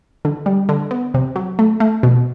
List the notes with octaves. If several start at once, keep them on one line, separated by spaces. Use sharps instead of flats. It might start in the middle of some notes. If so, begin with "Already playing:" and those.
D3
G3
D3
B3
C3
F#3
A3
A3
B2